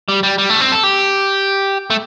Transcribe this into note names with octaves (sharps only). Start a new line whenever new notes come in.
G3
G3
G3
A3
C4
A4
G4
A3